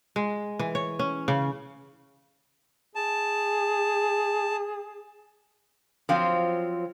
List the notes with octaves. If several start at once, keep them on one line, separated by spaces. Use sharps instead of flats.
G#3
E3
C#5
C#4
C#3
G#4 A5
F3 F#3 C4 F4